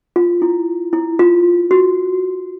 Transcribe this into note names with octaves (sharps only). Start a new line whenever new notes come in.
F4
E4
E4
F4
F#4